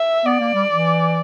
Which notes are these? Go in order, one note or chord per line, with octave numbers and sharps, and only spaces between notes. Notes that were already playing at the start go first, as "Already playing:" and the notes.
Already playing: E5
B3 D5
A#3
G3
E3